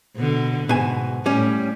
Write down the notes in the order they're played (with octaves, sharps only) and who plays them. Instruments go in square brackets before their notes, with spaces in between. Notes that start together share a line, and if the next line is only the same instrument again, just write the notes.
[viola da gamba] B2 D3
[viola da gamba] G#2 [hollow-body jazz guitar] B2 G#5
[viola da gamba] A2 [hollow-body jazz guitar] G3 C#4